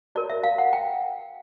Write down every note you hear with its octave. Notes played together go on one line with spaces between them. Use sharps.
F#4 A#4 C#5 D5
E5
F5
F#5
G5